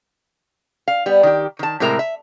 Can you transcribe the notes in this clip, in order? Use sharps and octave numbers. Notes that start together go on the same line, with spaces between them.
F5
G3 B3
D#3 G4
D#3 A5
A2 C3 G#3 A#4 E5 A#5
E5